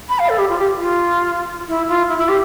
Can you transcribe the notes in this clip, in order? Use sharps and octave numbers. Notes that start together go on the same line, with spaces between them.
B5
F5
A4
G4
F4
G4
F4
E4
F4
E4
E4
G4